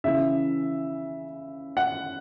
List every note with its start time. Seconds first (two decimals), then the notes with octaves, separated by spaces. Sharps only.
0.04 C#3 E3 E5
1.77 F#5